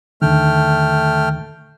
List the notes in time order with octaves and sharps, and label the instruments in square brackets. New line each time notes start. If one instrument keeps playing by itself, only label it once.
[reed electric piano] D#2 D3 D#3 [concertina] A3 G5 F6